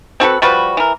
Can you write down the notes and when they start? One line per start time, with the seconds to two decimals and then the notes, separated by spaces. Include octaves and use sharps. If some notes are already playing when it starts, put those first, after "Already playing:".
0.20 C4 F#4 A4 B4
0.42 F3 G3 F#4 B4
0.77 E3 A#4